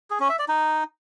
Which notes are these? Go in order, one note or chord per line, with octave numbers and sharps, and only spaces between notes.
G#4
C#4
E5
D5
D#4